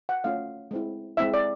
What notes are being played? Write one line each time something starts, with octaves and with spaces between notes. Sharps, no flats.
F#5
A3 C#4 F4 F5
G#3 C4 E4
G#3 C4 E4 E5
D5